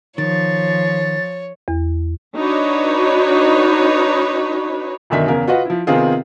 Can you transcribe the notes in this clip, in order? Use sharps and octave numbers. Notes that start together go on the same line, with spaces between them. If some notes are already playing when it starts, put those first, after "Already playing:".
D#3 F3 C#5 A6
E2
D4 D#4 F#4 B4 C#5
B1 F#2 D3 D#3 E5 B6
E2 C#3 A#4 F5
F4 F#4 B4 D#5 F#5
F3 E4
C3 D#3 B3 C4 F4 G#4